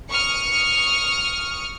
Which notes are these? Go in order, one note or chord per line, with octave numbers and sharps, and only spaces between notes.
C#6 D#6 F6 C#7